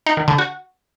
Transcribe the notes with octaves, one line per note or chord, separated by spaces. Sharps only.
D#4
D#3
D3
F#4